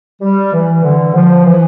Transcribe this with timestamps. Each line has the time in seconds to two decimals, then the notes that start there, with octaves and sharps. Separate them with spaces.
0.21 G3
0.53 E3
0.83 D3
1.14 F3
1.45 E3